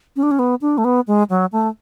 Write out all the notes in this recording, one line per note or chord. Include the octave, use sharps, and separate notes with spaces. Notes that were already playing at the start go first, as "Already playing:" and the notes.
C#4
D4
C#4
B3
D4
A3
B3
G#3
F#3
A3